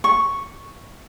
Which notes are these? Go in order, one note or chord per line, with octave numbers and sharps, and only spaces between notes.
C#6